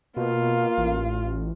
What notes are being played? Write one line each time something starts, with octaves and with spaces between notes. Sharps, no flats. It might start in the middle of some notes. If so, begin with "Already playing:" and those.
B2 A#3 F4
A1